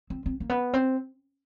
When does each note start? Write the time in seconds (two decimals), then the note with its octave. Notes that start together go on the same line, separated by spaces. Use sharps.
0.10 C4
0.26 C4
0.40 A#3
0.49 B3
0.73 C4